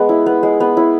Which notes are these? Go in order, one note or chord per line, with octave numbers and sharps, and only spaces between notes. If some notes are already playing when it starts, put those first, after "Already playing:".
Already playing: G#3 B3
E4
B3
G#3
B3
E4